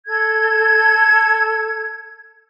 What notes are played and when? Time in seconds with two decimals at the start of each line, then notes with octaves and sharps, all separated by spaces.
0.06 A4 G#6